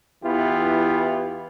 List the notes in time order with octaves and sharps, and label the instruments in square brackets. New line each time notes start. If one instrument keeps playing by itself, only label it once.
[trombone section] E2 E3 B3 E4 F4 G4